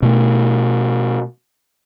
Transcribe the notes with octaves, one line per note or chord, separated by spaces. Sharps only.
B2 A3